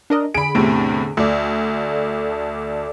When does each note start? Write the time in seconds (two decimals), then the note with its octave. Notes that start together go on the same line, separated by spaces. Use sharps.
0.10 D4 A#4 D#5
0.34 D3 G#4 B5 D7
0.55 E2 A2 C3
1.17 D2 A4 D5